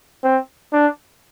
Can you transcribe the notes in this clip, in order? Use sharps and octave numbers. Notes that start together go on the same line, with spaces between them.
C4
D4